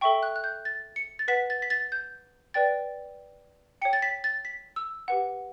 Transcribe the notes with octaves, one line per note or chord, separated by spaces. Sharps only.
A4 E5 G5 C#6
F#6
F#6
G6
A6
C#7
A6
B4 F#5 B6
A6
B6
A6
G6
B4 D5 G5 A6
C#5 G5 C#7
A6
B6
A6
B6
E6
G4 B4 F#5